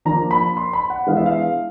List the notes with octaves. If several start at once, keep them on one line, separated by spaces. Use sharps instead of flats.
F3 A#3 D4 A#5
B5
C6
B5
F#5
E3 G#3 B3 D4 F5
E5
F5